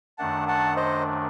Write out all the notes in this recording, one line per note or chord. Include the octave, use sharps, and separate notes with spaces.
F#2 D#3 A3 D4 F#5 A5
F#5 A5
C5 D#5